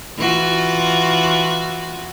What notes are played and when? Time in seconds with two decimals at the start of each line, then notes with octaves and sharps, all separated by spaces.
0.17 E3 F4 F#4